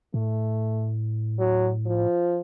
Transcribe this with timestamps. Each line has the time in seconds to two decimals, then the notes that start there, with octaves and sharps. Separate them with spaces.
0.14 A2 A3
1.39 F#3
1.86 F3